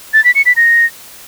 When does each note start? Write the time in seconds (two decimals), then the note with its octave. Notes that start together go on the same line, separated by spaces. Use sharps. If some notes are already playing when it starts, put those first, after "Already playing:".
0.14 A6
0.24 B6
0.35 C#7
0.46 B6
0.56 A#6